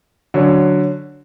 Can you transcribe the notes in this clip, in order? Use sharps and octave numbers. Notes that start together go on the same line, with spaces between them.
D3 F#3 C#4